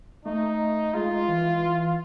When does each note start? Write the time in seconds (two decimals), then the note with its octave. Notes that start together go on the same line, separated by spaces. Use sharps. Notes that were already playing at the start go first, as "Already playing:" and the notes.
0.25 A3 D#4
0.94 G#3 F4
1.28 E3